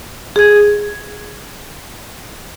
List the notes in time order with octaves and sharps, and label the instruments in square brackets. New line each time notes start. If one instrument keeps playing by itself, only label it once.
[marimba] G#4 G#6